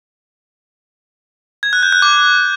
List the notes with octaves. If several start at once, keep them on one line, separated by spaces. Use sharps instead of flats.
G#6
F#6
G6
F#6
D6